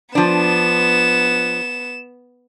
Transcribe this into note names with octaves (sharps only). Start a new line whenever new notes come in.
F3 B3 D4 E7